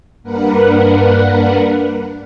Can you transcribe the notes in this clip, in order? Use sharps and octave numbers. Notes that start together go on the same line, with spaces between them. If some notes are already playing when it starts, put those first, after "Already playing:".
G2 A#3 D4 A#4 B4 F#5